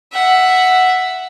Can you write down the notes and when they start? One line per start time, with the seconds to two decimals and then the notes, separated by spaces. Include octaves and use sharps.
0.12 E5 F#5